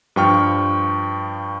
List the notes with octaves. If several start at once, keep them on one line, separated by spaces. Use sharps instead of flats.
G2 F3 G5 C#6 F6